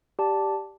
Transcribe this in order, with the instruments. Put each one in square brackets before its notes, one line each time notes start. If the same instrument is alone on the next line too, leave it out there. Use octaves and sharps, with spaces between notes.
[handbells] G4 D5 A5